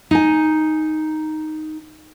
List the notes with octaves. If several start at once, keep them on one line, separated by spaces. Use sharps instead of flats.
D#4 G#5